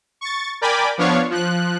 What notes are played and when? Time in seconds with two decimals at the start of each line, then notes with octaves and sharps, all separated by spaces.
0.21 C#6 A6
0.61 A#4 D5 G5 G#5 B5 D6
0.98 F3 B3 D4 C#5 F5 C#6
1.31 F3 F#6